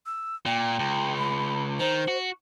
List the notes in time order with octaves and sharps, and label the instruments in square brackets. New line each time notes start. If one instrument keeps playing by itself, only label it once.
[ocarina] E6
[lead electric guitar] A#2 [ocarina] G5
[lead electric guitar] C#2
[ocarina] B5
[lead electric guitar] D#3 [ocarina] C5
[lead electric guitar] F#4